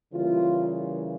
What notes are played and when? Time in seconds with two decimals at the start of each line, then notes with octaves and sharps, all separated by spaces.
0.13 C#3 E3 G3 A#3 F4